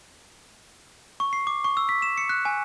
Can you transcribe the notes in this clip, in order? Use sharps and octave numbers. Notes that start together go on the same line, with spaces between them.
C#6
C7
D6
C#6
E6
B6
E7
C#7
F#6
G#5